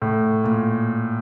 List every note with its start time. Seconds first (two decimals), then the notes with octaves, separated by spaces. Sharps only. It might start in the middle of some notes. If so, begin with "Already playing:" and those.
0.02 A2
0.44 A#2